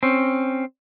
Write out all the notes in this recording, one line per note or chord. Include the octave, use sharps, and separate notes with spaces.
C4 C#4